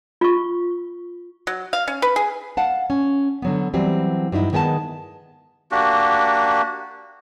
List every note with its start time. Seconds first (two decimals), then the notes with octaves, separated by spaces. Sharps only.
0.21 F4 C#6
1.47 F#3
1.73 F5
1.88 C#4
2.02 B4
2.16 G#4
2.57 F5 F#5 A5
2.90 C#4
3.42 D3 F#3 B3
3.74 E3 F#3 G3 C4
4.32 G2 F#3 D#4 E4
4.53 D#3 G#3 B3 G5 A5
5.72 A#3 D4 F#4 G4